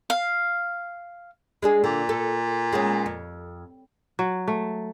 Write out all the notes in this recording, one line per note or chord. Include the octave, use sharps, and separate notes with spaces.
F5
G#3 D4 G#4
A#2 D3
A4
G#3 B3 C#4
F2
F#3
A3